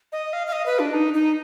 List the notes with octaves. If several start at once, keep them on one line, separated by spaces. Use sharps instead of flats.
D#5
F5
F5
D#5
B4
D4
D#4
D#4